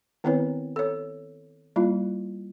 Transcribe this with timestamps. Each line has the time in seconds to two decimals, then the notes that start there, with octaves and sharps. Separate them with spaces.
0.24 D#3 B3 C4 E4 B4 C#5
0.76 A4 C#5
1.76 G3 A#3 E4 F4